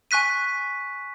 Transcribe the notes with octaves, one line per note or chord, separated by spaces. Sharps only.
G#5 C#6 F#6 B6 D#7